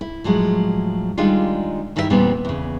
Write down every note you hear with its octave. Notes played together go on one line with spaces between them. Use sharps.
E4
A2 F3 F#3 G#3
D#3 G3 G#3 D4 D#4 F4
G2 D#3 E4 G4 A#4 E5
E2 A#2 G3 B3 C4
E2 C#3